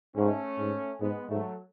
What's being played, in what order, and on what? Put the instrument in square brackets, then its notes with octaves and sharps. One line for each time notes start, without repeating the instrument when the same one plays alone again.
[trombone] G#2 [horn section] A3 C#4
[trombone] G#2
[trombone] G#2 [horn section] G#3 B3
[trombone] G#2 [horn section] F#3 A3